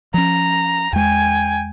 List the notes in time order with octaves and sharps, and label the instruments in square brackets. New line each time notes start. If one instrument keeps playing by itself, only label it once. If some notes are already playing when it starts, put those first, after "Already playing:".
[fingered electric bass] F3 C#4 [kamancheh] A#5
[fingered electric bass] E2 G#3 [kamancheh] G5 G#5